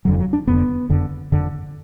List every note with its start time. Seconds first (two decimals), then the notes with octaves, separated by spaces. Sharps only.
0.05 F1 F2 D3 F#3
0.19 F#3
0.33 D4
0.47 F1 F2 D3 B3
0.89 F#1 F2 D3
1.32 F#1 F2 D3